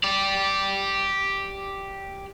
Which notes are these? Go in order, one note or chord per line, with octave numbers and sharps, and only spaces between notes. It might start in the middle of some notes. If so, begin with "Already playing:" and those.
G4 D5